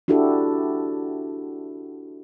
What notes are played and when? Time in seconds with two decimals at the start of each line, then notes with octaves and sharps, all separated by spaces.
0.08 D4 E4 F#4 G4 A4